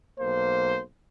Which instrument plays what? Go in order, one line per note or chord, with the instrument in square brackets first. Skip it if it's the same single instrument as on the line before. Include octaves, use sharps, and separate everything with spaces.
[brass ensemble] B1 A#3 C5